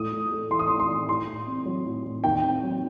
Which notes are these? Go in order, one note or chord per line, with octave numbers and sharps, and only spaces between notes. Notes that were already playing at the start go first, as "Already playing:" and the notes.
Already playing: A2 A3 D#6
A2
A3
E3 C6
D#6
A2 C6
C6
A2
A2 C6
A2
C4
F#3
A2
A2
D#2 G5
C4
F#3